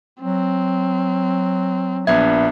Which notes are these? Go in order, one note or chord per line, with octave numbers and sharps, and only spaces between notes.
F#3 C4
A#1 B3 D4 E5 G#6